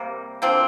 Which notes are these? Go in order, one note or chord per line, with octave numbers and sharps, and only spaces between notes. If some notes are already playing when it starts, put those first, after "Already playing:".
Already playing: C3 G3 A#3
D3 F3 A#3 C4